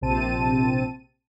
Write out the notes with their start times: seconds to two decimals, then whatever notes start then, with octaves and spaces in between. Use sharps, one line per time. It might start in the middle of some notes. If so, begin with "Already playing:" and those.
0.01 A#1 C3 C4 A5 D#7